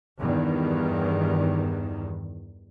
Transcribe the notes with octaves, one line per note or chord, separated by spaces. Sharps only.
E2 G2 D#3